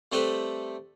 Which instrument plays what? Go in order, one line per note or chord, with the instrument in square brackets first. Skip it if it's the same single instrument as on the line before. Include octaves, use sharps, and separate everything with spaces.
[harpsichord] G3 A3 C4 A4 B4